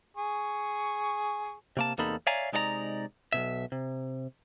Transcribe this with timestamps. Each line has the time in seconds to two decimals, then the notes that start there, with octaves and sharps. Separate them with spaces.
0.17 G#4 C#6
1.77 C3 A#3 A5
1.98 E2 C3 A#3 D#4 A4 B5
2.27 C#5 D5 E5 F5 G#5 A#5
2.53 C3 G#3 D#4 D5 F#5 A#5
3.33 B1 G2 B2 E5
3.72 C3